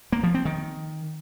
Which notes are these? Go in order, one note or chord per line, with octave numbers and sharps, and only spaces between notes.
A#3
F3
C4
D#3